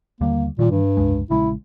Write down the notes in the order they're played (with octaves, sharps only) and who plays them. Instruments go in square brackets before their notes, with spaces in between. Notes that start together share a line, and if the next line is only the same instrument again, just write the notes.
[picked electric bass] D#2 D3 G3 [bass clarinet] A#3
[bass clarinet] A#2 [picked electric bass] D#3 E3 G3
[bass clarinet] G2
[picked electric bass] F1 C#2 G#3
[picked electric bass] A#1 C#3 G#3 [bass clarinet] E4